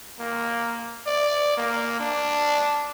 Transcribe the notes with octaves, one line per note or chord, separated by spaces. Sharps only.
A#3
D5
A#3
D4